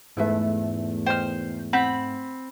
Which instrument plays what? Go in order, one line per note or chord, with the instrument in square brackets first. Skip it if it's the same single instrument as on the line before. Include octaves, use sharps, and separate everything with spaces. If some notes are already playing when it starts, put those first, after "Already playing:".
[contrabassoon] E2 [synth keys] G#2 A3 [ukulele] E4 B4 E5
[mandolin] C5 F6 [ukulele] D#5 G5
[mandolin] C4 B5 G6 [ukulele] F#5